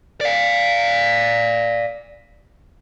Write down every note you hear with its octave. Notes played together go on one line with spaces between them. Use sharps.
D5 F5